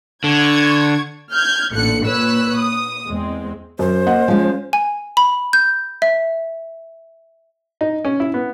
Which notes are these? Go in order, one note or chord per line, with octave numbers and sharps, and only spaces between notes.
D3 C#6 G#6
F6 G6 G#6
A1 A#2 D3 F#6 C#7
A#2 B4 C#5 E6 F#6
D#6
E2 G#3 C4
F#2 C5
A#3 D#5 F#5
F3 G#3 C#4
G#5
B5
G6
E5
D#4
C#4
E4
B3